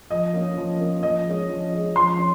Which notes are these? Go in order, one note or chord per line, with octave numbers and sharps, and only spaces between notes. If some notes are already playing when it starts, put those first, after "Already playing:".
F3 D#5
A#3 C#4
F3
A#3 C#4
F3 D#5
G#3 C#4
F3
G#3 C#4
F3 C6
C#4